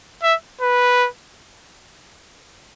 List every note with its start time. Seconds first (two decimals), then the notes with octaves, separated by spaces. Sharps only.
0.23 E5
0.61 B4